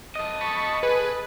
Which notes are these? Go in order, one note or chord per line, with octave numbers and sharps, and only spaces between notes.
A4 D#5
A5 B5 C#6
G#4 B4